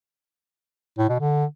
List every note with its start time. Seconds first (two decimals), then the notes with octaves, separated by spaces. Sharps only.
0.98 A2
1.09 B2
1.20 D3